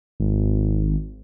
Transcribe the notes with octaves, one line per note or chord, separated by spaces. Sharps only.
G#1